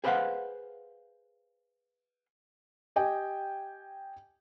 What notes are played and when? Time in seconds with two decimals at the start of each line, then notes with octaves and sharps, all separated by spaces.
0.04 G#4 B4 C5 D5 F5 F#5
2.96 G4 D#5 G5 G#5